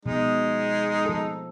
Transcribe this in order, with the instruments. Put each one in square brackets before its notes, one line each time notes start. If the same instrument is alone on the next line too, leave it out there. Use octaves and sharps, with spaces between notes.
[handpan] B2 F3 [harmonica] G#3 D#4
[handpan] F3 A4